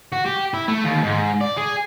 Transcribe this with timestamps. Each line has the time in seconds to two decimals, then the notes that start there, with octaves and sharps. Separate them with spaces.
0.13 F#4
0.26 G4
0.54 E4
0.68 A3
0.84 D#2
1.03 G#2
1.41 D5
1.57 G#4